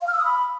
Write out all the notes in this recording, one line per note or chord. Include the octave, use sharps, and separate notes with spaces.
F5
F6
E6
D#6
B5